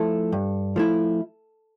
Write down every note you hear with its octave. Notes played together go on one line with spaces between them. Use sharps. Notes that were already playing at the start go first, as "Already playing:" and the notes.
Already playing: F3 A3 E4 A4
G2
F3 A3 E4